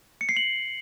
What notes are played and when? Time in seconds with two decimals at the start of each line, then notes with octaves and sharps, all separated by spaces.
0.21 C#7
0.29 C7
0.37 F#7